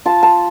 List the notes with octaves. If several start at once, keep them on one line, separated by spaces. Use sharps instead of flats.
F4 A5
A5